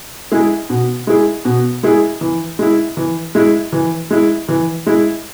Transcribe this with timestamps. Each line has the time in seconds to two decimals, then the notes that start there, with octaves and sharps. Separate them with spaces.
0.32 G#3 E4 G#4
0.70 B2
1.07 G#3 E4 G#4
1.45 B2
1.83 G#3 E4 G#4
2.21 E3
2.59 G#3 E4
2.97 E3
3.35 G#3 E4
3.73 E3
4.10 G#3 E4
4.49 E3
4.86 G#3 E4